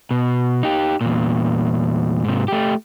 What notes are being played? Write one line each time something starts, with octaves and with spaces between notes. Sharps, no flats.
B2
D#4 G4
E2 A#2
G#2 C3
A3 G4